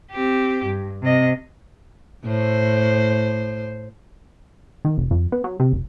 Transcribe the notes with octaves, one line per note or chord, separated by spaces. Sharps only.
C4 G4
G2
C3 D#5
A2 C5
D#3
F1
F2
B3
F#3
C3
F1